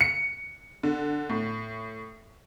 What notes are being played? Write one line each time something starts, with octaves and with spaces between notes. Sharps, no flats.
C#7
D3
A2